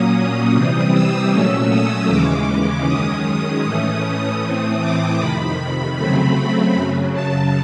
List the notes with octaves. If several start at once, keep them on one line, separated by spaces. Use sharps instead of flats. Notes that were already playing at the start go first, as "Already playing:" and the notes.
Already playing: A#2 F#3 A#3 C#4 D#6
C3 E3 G3 C4 D#6
E6
A#2 F#3 A3 C#4
D#6
D#2 C#3 E3 G#3 C#4 D6
F#2 D#3 G#3 C#4 D#6
D#6
A2 E3 A3 C#4
A2 E3 A3 C4 D#6
D6
F2 C3 D#3 B5
C#3 F#3 A3 C4 B5
F#2 C#3 F#3
A5